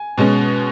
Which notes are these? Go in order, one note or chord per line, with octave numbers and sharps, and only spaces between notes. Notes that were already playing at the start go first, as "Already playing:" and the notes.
Already playing: G#5
B2 G#3 C#4